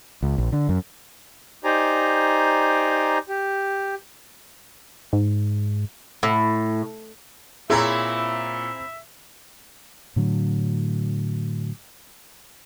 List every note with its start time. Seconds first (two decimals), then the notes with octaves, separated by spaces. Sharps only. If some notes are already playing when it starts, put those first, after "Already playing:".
0.23 C#2
0.38 A#1
0.52 D3
0.69 F#2
1.64 D#4 G4 C5 D5 G#5 A#5
3.29 G4
5.13 G#2
6.23 A2
7.70 A#2 C4 E4 G#4 C#5 E5 A#5
10.16 A2 D3 F#3